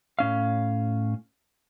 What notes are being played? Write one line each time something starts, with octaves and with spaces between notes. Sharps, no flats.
A2 C#4 F5